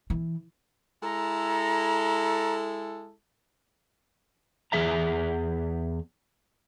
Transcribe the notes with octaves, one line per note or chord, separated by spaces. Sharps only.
E3
G#3 E4 A4 A#5
E2 G2 E3 G#4 E5 A#5